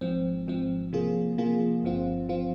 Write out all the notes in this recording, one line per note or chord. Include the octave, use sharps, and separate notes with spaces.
G#1 G#2 F3 C4
G#1 G#2 F3 C4
C3 F3 A#3 F4 G#4
C3 F3 A#3 F4 G#4
G1 G2 F3 C4 F4
F3 C4 F4